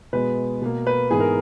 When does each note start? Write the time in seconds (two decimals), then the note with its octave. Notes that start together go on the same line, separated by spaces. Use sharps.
0.13 B2 G#3 B3 B4
0.62 B2 A#3
0.87 B4
1.11 G#2 E3 B3 G#4
1.20 A#4